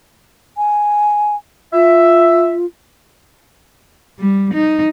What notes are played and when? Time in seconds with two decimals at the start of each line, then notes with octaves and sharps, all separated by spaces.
0.57 G#5
1.73 F4 E5
4.20 G3
4.54 D#4